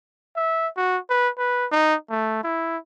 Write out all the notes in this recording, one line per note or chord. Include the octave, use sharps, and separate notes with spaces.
E5
F#4
B4
B4
D#4
A3
E4